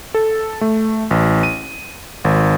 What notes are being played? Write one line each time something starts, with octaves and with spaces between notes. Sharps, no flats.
A4
A3
A1
D#7
G#1